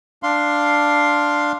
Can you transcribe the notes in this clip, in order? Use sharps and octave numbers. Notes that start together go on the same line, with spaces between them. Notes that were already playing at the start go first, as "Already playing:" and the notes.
D4 F5 C6